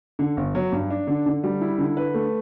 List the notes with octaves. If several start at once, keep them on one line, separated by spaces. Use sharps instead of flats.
D3
G1
F#3
G2
D4
D3
D3
G3
E4
D3
B4
A3